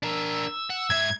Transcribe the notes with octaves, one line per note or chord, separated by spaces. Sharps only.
D4 A#4 E6
F#5
G#2 E5 G#6